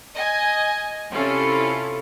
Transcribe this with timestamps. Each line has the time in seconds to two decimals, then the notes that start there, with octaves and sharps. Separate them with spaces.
0.15 D#5 G#5
1.11 C3 C#4 E4 F4 A4